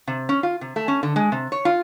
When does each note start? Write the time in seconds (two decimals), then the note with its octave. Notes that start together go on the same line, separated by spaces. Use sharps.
0.07 C3
0.29 C#4
0.43 F4
0.61 C3
0.76 A3
0.88 C#4
1.03 D3
1.16 G#3
1.32 C3
1.52 C#5
1.65 F4